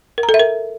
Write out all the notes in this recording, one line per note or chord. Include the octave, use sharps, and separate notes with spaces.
A#4
A#5
A4
E5
A#4